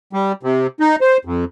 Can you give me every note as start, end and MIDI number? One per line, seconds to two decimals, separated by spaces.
0.13 0.32 55
0.43 0.67 48
0.80 0.96 63
1.01 1.17 72
1.25 1.45 41